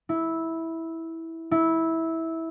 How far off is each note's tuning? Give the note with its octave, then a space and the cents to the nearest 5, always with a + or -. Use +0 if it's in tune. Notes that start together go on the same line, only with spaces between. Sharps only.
E4 -10
E4 -15